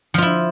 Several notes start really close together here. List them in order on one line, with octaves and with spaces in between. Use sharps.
F3 F4 E4